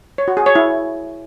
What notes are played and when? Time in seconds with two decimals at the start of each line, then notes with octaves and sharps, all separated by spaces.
0.18 C#5
0.28 F#4
0.37 G#4
0.46 C#5
0.55 E4